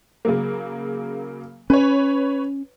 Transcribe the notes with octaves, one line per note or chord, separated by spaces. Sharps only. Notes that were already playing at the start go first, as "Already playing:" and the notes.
C#3 F#3 A#3
C#4 B4 C#5